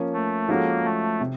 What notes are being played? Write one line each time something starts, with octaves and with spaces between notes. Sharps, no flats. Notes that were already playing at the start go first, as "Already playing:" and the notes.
Already playing: F3 A#3 C#4
A3
F3 G#3 A#3 C#4 F#4 A4
A3
C3